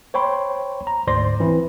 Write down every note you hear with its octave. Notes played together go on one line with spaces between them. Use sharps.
C5 C#5 G5 B5 C6
A#5
D2 G#2 C5 D5 C6 A#6
E3 C4 E4